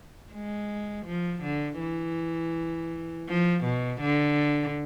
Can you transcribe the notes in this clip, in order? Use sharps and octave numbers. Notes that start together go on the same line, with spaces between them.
G#3
F3
D3
E3
F3
B2
D3